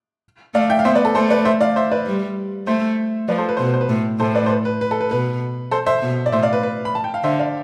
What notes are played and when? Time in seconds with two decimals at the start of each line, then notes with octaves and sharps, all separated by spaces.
0.54 A3 D5 F5
0.70 E5 G5
0.79 F5
0.85 B3 C5 E5
0.95 B4 D5
1.05 A4
1.15 A3 A4 C5
1.30 B4 D5
1.45 C5 E5
1.61 D5 F5
1.76 C5 E5
1.91 B4 D5
2.06 G3
2.67 A3 C5 E5
3.28 F3 B4 D5
3.38 A4 C5
3.49 B4
3.57 B2 C5
3.65 B4
3.74 C5
3.81 B4
3.89 A2
4.19 A2 A4 C5
4.34 B4 D5
4.46 C5
4.50 B4
4.65 B4
4.81 B4
4.91 A4
5.01 B4
5.11 B2 B4
5.71 A4 C5
5.86 C5 E5
6.02 B2
6.26 D5
6.32 A2 C5 E5
6.42 D5 F5
6.53 B4
6.63 B4
6.85 B5
6.95 A5
7.04 G5
7.14 F5
7.24 D3 C5 E5
7.39 D5 F5